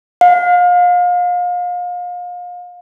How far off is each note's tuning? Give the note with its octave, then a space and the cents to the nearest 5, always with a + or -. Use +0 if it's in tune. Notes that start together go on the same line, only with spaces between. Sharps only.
F5 +35